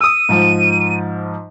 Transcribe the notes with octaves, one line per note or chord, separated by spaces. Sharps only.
D#6 E6 D#7
G#2 F3